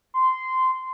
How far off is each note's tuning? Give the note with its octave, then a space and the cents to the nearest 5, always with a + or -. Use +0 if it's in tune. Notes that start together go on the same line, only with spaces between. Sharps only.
C6 -15